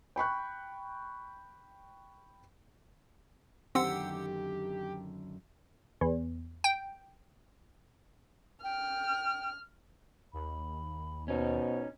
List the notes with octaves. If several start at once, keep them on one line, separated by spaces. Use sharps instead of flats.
G5 B5 C#6 F#6
F#2 D3 D#3 C4 G4 F#5 E6
E2
G5
G5 F6
D#2 B5
B2 C#4 D#4 C5